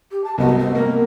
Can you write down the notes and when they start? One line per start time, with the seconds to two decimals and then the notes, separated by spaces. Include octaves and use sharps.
0.11 G4
0.24 A5
0.38 C2 B3 F#4 D#5
0.59 C4
0.75 A#3 A#4